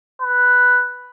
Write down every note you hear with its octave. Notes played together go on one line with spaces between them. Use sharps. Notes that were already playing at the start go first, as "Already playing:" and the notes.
B4